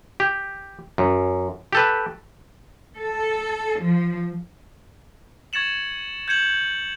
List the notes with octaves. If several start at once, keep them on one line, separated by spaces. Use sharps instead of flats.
G4
F#2
G4 A4 B4
A4
F3
C#6 G#6 A6 C#7 E7 F#7
G6 G#6 C#7 E7 F#7